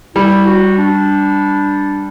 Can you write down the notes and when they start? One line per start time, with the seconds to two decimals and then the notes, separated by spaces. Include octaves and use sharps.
0.15 G3 E4
0.46 F#4
0.78 D4